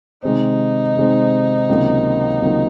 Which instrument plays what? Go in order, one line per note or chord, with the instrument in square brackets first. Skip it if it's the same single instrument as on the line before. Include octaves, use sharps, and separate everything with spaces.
[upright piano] C3 D#3 G#3 C4 [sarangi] D#4
[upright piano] C3 D#3 G#3 C4
C#2 C3 D#3 F#3 A#3
C#2 C3 D#3 F#3 A#3